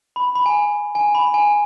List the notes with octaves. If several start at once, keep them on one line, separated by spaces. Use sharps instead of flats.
B5
B5
G#5
G#5
B5
G#5